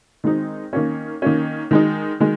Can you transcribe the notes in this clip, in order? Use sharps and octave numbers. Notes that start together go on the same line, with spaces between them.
D#3 G#3 C4 D#4
D#3 A#3 C#4
D#3 A#3 C#4
D#3 G#3 D#4
D#3 G#3